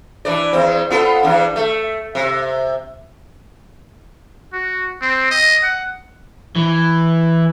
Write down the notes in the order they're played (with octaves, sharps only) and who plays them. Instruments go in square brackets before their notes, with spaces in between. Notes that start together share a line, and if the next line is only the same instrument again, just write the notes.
[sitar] E3 D4 D5
E2 C4
B3 F4 A4
E2 D4
A3
C3
[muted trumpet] F#4
C4
D#5
F#5
[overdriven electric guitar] E3